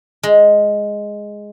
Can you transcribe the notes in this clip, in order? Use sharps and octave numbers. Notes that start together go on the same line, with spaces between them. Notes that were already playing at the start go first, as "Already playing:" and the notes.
G#3